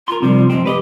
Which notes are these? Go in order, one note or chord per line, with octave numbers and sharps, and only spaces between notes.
F4 A#4 C6
C3 F3 G3
F2 G#3 C4
G4 B4 D5 D#5